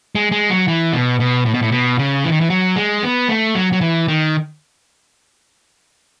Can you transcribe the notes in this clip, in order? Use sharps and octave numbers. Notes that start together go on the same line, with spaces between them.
G#3
G#3
F#3
E3
B2
B2
A2
B2
A2
B2
C#3
E3
D#3
E3
F#3
G#3
B3
A3
F#3
F#3
E3
D#3